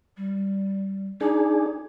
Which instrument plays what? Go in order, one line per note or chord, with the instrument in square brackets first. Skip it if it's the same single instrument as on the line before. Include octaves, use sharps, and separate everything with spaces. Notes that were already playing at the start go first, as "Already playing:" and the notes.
[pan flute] G3
[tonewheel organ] D4 G#4 [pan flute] D#4